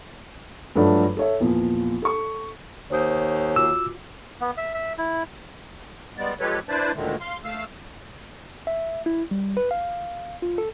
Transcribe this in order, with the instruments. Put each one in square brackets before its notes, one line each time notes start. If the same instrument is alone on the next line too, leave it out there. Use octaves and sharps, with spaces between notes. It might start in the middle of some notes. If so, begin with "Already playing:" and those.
[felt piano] G2 F3 F#3 A3 D4
A4 C#5 E5
E2 A#2 F3
A4 C#6
[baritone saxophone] D#2 [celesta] C5 D#6 G6 [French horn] C#5
[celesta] F4 F#4 D6 [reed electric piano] E6
[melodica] B3
E5
E5
E4
[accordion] G3 G#3 B3 D5
F3 G#3 G4 A4 B4 C#5
D4 E4 B4 C5 D5 A5
D2 A#2 D3 D#3 G#3 A3
F5 C6
A3 F5 E6
[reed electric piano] E5
E4
G3
B4
F5
F4
A4